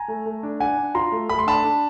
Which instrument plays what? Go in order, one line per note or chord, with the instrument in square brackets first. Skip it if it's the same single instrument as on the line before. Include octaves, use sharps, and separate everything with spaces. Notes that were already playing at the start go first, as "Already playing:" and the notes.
Already playing: [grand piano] G#5 A#5
[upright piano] A3
A3
D4
[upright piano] D4 [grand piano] F#5 G#5
[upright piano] D4
[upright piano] F4 [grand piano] A#5 C6
[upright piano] A3
[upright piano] A3 [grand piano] B5
[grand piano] C6
[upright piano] D4 [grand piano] A5 B5
[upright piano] D4